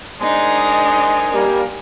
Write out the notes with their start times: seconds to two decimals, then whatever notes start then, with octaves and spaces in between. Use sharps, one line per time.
0.21 G#3 D4 D#4 A#4 C5 G#5
1.33 G3 A#3